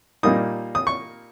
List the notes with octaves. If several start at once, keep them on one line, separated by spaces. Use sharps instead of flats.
A#2 G3 A#3 D#4 D#6
D#6
C#6